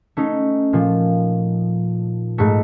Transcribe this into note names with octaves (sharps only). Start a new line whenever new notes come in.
A3 C#4 D#4
A#2 F3
G#2 A3